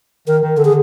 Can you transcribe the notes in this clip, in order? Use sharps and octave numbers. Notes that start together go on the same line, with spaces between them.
D#3 A#4
D#3
D3 A4
G#4